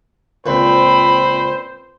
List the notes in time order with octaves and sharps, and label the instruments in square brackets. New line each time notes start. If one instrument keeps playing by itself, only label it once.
[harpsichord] C#2 A#2 [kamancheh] C4 B5 [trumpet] C5